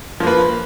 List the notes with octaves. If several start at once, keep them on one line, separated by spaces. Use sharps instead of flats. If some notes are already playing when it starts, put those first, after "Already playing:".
F3 A#3 B4